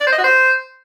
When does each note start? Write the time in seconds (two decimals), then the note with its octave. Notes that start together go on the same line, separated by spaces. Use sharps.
0.01 D5
0.06 C5
0.12 D#5
0.18 F#4
0.24 C5